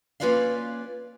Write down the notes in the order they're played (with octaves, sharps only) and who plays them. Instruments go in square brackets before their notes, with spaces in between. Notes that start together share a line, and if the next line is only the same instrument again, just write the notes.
[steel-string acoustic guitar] A#3 C#4 F4 B4 D5 F5